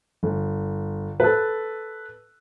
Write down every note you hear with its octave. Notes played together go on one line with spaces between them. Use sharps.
G1
A4 B4